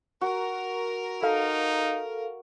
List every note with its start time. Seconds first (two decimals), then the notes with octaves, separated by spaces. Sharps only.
0.21 F#4 A#4
1.23 D#4 A4 F5